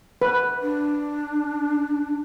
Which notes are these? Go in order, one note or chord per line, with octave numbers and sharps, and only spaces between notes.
B4
D4